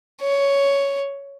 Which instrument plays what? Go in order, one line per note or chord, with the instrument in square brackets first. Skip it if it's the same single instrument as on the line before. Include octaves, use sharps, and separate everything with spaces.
[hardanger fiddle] C#5